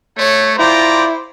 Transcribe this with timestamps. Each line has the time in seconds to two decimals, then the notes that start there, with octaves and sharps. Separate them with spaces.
0.18 A3 C#5
0.59 E4 F4 C5 D5 G5 A#5